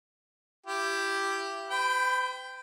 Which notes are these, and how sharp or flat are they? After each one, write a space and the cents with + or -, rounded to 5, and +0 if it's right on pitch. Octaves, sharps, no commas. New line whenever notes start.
E4 +35 G4 +0
C5 -45 G5 +0 B5 +25